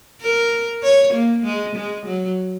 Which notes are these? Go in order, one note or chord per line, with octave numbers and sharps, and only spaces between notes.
A#4
C#5
A#3
G#3
G#3
F#3